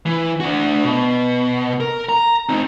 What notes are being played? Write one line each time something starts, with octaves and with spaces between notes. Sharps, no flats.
E3
D4 F#4
B2
A#4
A#5
C4 D#4